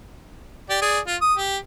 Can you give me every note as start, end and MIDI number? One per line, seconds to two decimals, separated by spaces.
0.69 0.79 67
0.69 0.79 74
0.82 0.99 68
0.82 0.99 74
1.07 1.16 65
1.21 1.35 87
1.37 1.57 67